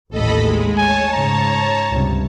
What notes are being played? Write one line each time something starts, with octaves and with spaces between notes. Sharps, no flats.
A1 D#2 A2 A4 D#5 B5
G#3
C#5 G#5 A5
G#2 C#3 A#5
C#2 G2 C3